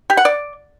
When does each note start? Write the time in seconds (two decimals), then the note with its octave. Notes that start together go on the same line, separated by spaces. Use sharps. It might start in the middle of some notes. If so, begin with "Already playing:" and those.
0.10 G4
0.17 F#5
0.25 D5